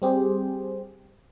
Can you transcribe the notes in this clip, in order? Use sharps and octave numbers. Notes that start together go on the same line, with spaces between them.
G3 C4 G4 G#4 C5